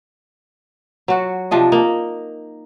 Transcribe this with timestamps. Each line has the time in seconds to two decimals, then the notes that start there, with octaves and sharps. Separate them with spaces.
1.08 F#3 F#4
1.51 C3 F3 D4 D#5
1.72 A#3 D#4